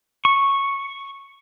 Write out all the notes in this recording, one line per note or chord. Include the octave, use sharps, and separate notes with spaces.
C#6